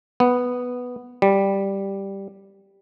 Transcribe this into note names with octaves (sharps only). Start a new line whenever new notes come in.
B3
G3